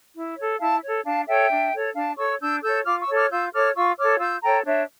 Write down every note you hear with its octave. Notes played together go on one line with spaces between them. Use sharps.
E4
A4 C#5
E4 F5 A5
A4 C#5
D4 F5 A5
A4 C#5 E5 G5
D4
A4 C#5
D4 F5 A5
A4 C#5 C#6 E6
D4 E6 G6
A4 C#5 E6 G6
F4 D6 F6
C#6 E6
A4 C#5
D6 F6
F4 E6 G6
A4 C#5 D6 F6
F4 C#6 E6
A4 C#5 D6 F6
F4 E6 G6
A4 C#5 G5 A#5
D4 C#5 E5